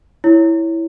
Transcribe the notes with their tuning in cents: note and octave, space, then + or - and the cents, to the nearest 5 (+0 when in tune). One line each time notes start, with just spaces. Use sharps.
E4 +0 C#5 +0